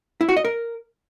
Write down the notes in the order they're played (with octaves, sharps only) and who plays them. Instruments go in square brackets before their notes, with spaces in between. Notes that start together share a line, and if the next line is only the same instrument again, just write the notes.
[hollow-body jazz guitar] E4
F#4
D#5
A#4